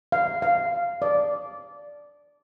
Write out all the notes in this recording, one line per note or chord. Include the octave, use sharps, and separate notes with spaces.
F5
F5
D5